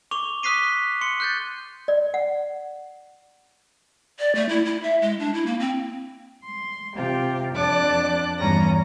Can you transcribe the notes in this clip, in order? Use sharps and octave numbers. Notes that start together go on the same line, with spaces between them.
C#6 D6 F7 G7
C#6 D#6 F#6 B6 C7 D#7
C6 C#7 G7
F#6 G6 A6
D5
F#5
D5
A3
E4
E4
E5
G#3
D4
E4
A#3
C4
C6
C3 F4 G4
F2 D4 D5 A5 D6 F#6
E2 G2 C#4 A#5 A#6